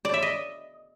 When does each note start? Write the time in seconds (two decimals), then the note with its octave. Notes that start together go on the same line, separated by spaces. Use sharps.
0.05 D5
0.14 E5
0.22 D#5